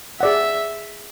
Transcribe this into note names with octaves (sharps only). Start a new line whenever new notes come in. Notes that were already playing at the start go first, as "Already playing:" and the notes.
G#4 D5 E5 F#5